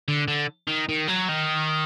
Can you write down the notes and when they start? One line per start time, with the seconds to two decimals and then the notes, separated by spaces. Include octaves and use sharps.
0.08 D3
0.28 D3
0.68 D#3
0.89 D#3
1.08 F#3
1.28 D#3